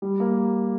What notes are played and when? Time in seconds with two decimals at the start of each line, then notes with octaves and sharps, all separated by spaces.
0.02 G3
0.20 A#3